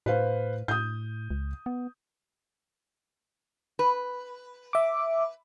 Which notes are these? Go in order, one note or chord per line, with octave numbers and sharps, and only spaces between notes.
A2 B4 C5 F5
A2 D#6 G6
C#2
B3
B4
E5 D6